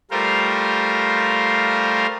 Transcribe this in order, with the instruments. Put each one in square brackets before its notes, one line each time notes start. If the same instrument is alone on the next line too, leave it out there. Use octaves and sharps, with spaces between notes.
[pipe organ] G3 A3 F4 A#4 C5 F5